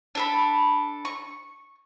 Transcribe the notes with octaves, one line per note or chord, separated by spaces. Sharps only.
D4 A4 B5
C#6